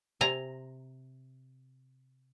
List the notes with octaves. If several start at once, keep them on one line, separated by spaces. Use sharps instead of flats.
C3 G#5 A#5